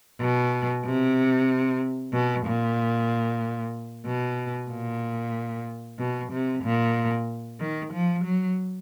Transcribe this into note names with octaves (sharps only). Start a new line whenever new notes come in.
B2
C3
B2
A#2
B2
A#2
B2
C3
A#2
D#3
F3
F#3